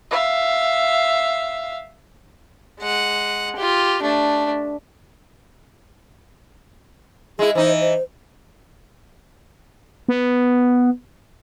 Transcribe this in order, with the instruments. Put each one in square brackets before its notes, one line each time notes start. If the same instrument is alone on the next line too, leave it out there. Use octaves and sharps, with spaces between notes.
[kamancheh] E5 F5
[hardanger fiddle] G#3 F#5
F4 G4
A3 D4
[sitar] G#3 E4 [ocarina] G#4
[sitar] E3 D#4 [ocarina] C5
[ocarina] C5
[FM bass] B3